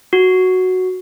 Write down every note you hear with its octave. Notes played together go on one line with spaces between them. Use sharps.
F#4